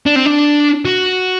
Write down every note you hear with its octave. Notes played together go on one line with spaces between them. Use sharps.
D4
C4
D4
F#4